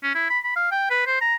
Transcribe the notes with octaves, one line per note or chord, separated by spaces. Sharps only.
C#4
E4
B5
B5
F5
G5
B4
C5
A#5